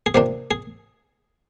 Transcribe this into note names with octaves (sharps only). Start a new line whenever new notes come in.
G#4
C3 F3 A#3 D4 G4
G#4